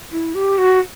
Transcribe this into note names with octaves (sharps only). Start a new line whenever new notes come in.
E4
G4
F#4